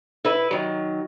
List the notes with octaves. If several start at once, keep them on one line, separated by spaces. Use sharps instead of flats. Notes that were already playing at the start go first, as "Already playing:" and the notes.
E4 B4 E5
D#3 F#3